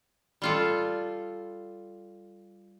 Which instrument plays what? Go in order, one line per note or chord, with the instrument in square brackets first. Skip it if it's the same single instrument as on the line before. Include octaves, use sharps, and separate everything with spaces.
[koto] G3 F4 A4